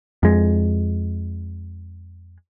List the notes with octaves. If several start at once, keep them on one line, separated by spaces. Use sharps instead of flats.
F2 G#3